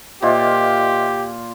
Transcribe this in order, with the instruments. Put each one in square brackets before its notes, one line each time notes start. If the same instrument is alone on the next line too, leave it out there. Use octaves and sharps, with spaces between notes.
[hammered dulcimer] A#2 F4 [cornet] G4 [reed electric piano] C5 D#5 E5